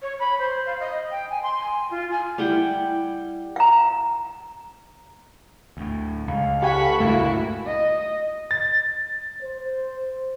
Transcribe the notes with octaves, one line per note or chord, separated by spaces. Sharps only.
C#5
B5
C5
F5
D#5
G5
G#5
C6
G#5
F4
G#5
G3 E4 F#5 G5
F5 A#5
D2 A2
C#2 F5
G4 A4 F#5 G#5 B5 C#6
C#2 G2 A#2 A3 A#3 E4 F#4
D#5
A6
C5